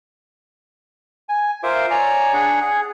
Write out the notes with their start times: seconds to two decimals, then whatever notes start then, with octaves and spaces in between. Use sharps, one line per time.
1.29 G#5
1.63 F4 A#4 C5 E5 D6
1.90 C#5 D5 G#5 A#5
2.33 D4 G#4 F#5
2.61 G#4